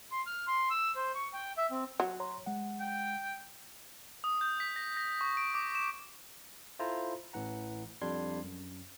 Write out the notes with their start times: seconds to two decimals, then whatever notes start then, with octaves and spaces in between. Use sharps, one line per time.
0.12 C6
0.26 F6
0.47 C6
0.70 E6
0.96 C5
1.15 C#6
1.33 G5
1.57 E5
1.71 C4
2.00 F#3
2.20 C#5 A#5 C6
2.46 G#3 F#5
2.80 G5
4.24 D#6
4.41 G6
4.60 B6
4.76 A#6
4.97 A#6
5.21 C#6
5.37 D7
5.54 D6
5.75 E7
6.79 E4 F4 A4 C5 A#5
7.33 A1 A2 E3 F#5 A#5
8.01 F2 G3 D4 C6 G#6 C7
8.44 F#2